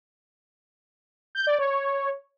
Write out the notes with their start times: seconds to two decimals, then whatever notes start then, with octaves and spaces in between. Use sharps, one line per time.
1.35 G6
1.47 D5
1.59 C#5